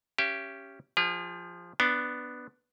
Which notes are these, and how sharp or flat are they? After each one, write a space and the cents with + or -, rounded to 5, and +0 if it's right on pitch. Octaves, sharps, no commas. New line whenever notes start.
C#4 +0 G4 +0 E5 +40
F3 +0 G#4 -40
B3 +0 D4 +0